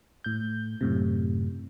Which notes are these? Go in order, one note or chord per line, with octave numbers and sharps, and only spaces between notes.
A2 G6
F#2 A2 C3